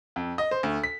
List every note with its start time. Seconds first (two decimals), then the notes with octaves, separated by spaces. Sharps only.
0.16 F2
0.38 D#5
0.51 C5
0.63 D2
0.84 B6